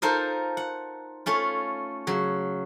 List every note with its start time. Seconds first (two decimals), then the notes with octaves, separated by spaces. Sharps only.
0.02 D#4 F4 A4 A#4 C5 D#5
0.57 F#5
1.26 A3 C#4 F4
2.07 C#3 F#3